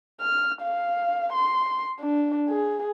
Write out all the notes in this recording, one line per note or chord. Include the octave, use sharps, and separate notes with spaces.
F6
F5
C6
D4
G#4